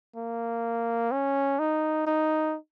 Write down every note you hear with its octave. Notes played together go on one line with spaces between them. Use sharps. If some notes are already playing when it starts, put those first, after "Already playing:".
A#3
C#4
D#4
D#4